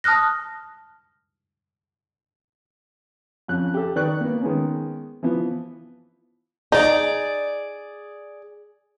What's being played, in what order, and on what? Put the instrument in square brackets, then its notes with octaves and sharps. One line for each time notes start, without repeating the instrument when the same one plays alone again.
[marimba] A5 D#6 F6 F#6 A#6
[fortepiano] F2 C#4 F#6
G4 A4
D#3 B4 D5 C#6 F#6
A#3 B3
D#3 G#3 B3 C#4
E3 F3 B3
[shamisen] D#4 [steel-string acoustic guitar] G#4 D5